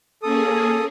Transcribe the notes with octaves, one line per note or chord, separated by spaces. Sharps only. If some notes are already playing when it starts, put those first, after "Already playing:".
A#3 C#4 G#4 A4 D#6